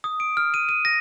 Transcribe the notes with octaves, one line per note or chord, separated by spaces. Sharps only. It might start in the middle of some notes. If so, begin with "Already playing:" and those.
D#6
D7
F6
D#7
D#7
A#6